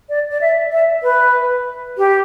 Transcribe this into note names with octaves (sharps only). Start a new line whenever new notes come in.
D5
D5
E5
E5
B4
G4